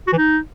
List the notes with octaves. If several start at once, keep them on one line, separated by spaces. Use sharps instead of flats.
F#4
E3
D#4